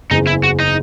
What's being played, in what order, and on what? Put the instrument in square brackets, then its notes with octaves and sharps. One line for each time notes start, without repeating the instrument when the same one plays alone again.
[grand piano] F#1 E2 C#3 [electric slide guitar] D#4
[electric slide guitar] E4
F#4
D#4